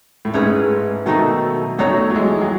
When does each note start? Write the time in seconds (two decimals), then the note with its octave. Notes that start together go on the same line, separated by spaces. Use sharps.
0.25 A2
0.33 G#2 A3 C#4 G#4 B4
1.06 B2 D#3 F#3 A3 D#4 A4
1.78 F#3 A3 B3 D#4 F#4 A4 C#5
2.10 F#3
2.15 E3 G#3
2.41 F#3